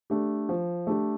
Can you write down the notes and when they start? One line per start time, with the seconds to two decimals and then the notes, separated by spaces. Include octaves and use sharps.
0.10 A3 D4 G4
0.49 F3
0.87 A3 D4 G4